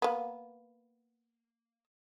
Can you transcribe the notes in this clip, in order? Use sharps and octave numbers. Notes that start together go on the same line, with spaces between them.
A#3 B3